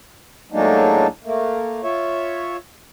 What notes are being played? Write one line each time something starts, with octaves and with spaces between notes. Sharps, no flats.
A2 F#3 G#3 A#3 D4 D#4
A3 A#3
F4 C#5 E5